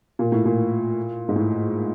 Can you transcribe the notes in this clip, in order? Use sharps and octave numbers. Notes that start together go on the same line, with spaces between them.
A#2
A2
A#2
G#2
A2